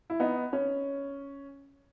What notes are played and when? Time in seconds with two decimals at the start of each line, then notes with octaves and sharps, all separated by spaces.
0.10 E4
0.20 B3 D#4
0.53 C#4